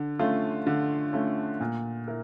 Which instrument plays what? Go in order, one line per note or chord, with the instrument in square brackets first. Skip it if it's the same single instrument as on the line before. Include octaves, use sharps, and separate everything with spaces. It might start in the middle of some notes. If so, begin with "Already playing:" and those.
Already playing: [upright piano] D3
A3 C#4 F4
D3
A3 C#4 F4
A#2
E4 A#4